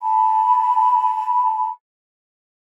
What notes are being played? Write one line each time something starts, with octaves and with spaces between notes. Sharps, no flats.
A5 B5